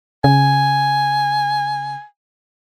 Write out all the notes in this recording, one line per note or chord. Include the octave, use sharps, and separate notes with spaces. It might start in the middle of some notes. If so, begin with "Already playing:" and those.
C#3 G#5